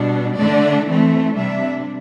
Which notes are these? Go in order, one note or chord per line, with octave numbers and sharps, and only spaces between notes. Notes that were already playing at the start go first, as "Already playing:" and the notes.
Already playing: B2 G3 D4
D3 A3 D4 D5
E3 A3 C4
C3 G3 D4 E5